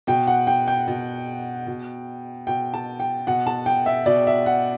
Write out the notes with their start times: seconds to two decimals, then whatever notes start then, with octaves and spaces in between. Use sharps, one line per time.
0.07 B2 G5
0.27 F#5
0.47 G5
0.68 G5
0.88 B2
1.67 B2
2.47 B2 G5
2.74 A5
3.00 G5
3.27 B2 F#5
3.47 A5
3.66 G5
3.86 E5
4.06 B2 D5
4.27 E5
4.46 F#5